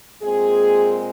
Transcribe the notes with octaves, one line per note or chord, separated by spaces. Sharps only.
A#2 G#3 C4 G#4